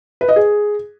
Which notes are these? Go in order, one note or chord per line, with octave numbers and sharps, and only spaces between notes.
B4
D#5
G#4